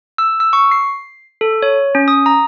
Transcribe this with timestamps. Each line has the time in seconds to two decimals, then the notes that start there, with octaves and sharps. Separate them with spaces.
0.18 E6
0.40 E6
0.53 C#6
0.71 C7
1.41 A4
1.62 C#5
1.95 C#4
2.08 D#6
2.26 A#5